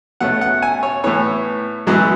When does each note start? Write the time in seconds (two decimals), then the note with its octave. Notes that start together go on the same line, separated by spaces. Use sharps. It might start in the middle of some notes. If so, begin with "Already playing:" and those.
0.20 B2 A3 C#4 F#5
0.41 F#5
0.62 G#5
0.83 C#5
1.04 A2 E3 B3 C#5
1.87 F#2 E3 G#3 B3 F#4